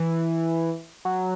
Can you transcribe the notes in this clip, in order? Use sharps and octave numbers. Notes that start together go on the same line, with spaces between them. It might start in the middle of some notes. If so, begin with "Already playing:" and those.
Already playing: E3
F#3